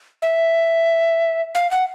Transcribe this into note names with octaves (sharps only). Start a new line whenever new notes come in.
E5
F5
F#5